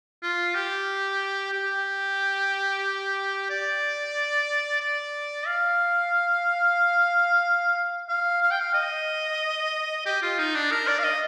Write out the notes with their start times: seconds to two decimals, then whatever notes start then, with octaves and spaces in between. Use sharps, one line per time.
0.22 F4
0.55 G4
1.53 G4
3.50 D5
4.81 D5
5.47 F5
8.09 F5
8.42 F5
8.51 G5
8.60 F5
8.74 D#5
10.06 G4
10.22 F4
10.39 D#4
10.55 D4
10.72 A#4
10.88 D5
10.99 F5
11.04 D#5